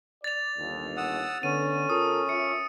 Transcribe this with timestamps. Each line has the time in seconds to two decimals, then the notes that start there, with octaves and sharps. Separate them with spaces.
0.24 D5 A6 F7
0.58 G1 D#2
0.97 F#5 D#6 E6
1.43 D3 B3 C#4 D#7
1.90 F4 A4 A#4 D#6
2.29 F4 E5 C#7